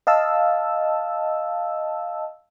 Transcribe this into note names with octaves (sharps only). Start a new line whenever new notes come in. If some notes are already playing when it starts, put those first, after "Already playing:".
D#5 F5 A5 E6